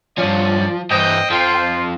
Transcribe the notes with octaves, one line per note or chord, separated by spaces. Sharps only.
G2 F3 C#4 D5
G2 E3 C5 D#5 G5
F2 F3 F4